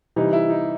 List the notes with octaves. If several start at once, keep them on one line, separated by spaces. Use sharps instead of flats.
C3 E3 G3 D#4
E4
D#4